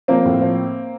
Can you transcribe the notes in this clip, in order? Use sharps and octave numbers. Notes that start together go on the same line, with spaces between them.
F3 A#3 C4
A2
F3